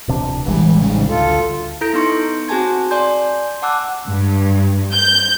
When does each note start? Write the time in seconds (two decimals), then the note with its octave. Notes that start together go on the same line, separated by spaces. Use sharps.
0.08 D1 C3 D4
0.46 A1 E3 G3 G#3
0.81 G#2 C#3
1.08 D2 F4 A4
1.81 E4 A4 A#5 G6 A#6 D7
1.93 B3 D#4 C6 C#6 C#7
2.48 C4 F#4 G#4 G#5 A5 G#6
2.91 D5 G#5 C6 G6
3.62 F#5 A5 D6 E6 F#6
4.07 G2
4.93 G6